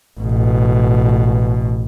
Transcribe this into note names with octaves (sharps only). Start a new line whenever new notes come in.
A1 B2